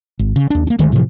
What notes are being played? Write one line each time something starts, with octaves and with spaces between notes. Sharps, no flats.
G#1
C#3
D#2 D4
A#3 D4
D2 D#3 G#3 A3
A2 C3 E3 F3